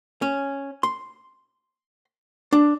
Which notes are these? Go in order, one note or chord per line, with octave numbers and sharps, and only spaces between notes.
C#4
C6
D4